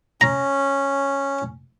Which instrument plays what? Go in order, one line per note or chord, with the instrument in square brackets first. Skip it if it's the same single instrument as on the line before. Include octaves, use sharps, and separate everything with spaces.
[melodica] C#4 [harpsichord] A#5